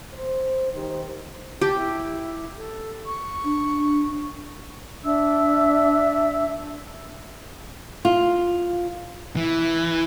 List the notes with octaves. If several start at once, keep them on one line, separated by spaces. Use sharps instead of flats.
C5
D#3 G4 C5
G4 A5
E4
A4
C#6
D4
D4 E5 E6
F4
E3